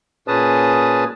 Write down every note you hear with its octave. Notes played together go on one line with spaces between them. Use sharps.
A#2 C#4 G#4 B4 A5 D#6